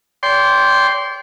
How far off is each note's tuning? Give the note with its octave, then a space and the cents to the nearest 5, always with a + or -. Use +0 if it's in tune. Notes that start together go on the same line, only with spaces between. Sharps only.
D5 -40 G5 +0 C6 +0